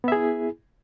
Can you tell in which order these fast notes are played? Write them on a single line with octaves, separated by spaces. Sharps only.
B3 E5 G#4 E4